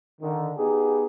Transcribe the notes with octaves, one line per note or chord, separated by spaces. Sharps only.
D3 D#3
B3 D#4 G4 G#4